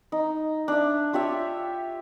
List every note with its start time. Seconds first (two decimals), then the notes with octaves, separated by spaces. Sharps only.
0.12 D#4
0.68 D4 E5
1.13 F4 G4 C#5 E5